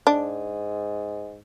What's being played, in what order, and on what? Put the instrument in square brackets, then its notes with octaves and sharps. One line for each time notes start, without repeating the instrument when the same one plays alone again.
[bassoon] G#2 [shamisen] D4